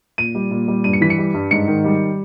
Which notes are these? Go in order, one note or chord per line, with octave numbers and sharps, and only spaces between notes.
A#2 D#7
G3
A#2
G3
G2 D#7
C#7
E3 B6
C#7
G3
G2
G#2 C#7
D#3
G3